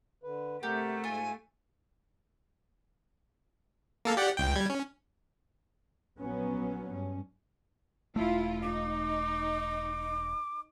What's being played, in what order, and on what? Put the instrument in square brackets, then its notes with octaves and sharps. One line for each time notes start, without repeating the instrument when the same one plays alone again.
[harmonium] D3 B4
[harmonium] C3 A#4 F#5 [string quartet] A3 [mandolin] G4
[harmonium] G#2 [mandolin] F4 [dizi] G#5
[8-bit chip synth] A#3 A4 F5
G4 D5 F#5
C#2 G5
G3 G#6
C#4
[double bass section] A#1 F#3 B3 C#4
G2 C#4
[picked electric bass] E1 A3 [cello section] E4 F4
[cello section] D#4 [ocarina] D6